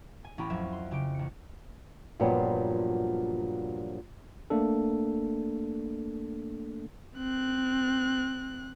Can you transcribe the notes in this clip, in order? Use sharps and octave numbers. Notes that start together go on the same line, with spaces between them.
G#5
A1 C#4 E4 G4 A#5 B5
F2 F#3 E5 G#6
C6
C#3 G4 D7
A1 C#7
G2 A#2 F3 F#3 B3 C4
A3 A#3 D4 A4
C4 F#6